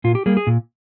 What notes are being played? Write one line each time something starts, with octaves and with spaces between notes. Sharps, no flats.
A#2 F4
G4
G3 A#3 G#4
G#4
A#2